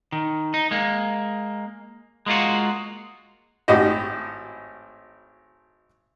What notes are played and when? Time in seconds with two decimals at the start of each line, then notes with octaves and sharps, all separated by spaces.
0.12 D#3
0.54 D#4
0.71 G#3 A#3
2.26 G#3 A#3 F4 F#4
3.68 G#1 A2 F#4 G4 D#5